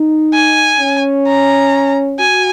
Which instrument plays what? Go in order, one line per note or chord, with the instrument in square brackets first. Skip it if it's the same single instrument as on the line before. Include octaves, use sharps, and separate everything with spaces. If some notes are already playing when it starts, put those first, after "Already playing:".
Already playing: [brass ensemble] D#4
[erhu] G#5
[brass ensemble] C#4
[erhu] A#5
[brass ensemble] F#4 [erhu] G#5